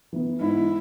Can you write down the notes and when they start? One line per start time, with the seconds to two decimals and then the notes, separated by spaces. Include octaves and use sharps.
0.13 E3 B3
0.40 G#2 E4